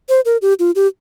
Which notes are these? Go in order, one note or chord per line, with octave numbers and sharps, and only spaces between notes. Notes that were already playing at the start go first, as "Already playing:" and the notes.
C5
A#4
G4
F4
G4